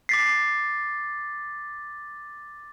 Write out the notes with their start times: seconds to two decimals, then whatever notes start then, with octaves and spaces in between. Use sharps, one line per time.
0.09 D6 A6 B6 C7